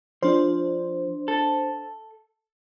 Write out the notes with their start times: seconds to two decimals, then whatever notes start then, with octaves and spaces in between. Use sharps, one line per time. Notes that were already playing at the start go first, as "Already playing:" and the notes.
0.22 F3 D4 C5
1.28 A4